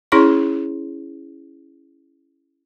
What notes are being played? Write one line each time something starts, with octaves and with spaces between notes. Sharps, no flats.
C#4 E4 G#4 C#5 C6 C#6